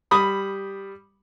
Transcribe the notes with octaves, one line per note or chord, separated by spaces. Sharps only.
G3 B5 D#6